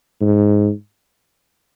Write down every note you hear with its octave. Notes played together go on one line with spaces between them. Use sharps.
G#2